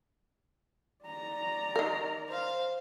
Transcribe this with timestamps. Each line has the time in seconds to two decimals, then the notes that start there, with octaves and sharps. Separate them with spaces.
1.05 D5 A#5
1.76 D#3 A#4
2.29 C5 F5